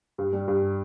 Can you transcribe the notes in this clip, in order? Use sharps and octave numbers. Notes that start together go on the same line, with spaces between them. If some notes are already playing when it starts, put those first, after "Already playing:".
G2
G3
G2